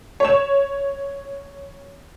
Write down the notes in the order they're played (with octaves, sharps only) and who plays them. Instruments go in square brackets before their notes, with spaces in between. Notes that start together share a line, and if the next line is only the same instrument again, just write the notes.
[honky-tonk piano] C#5 E7